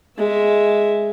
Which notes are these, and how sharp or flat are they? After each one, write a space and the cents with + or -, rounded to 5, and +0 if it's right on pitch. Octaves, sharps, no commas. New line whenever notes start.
G#3 +0 E5 +0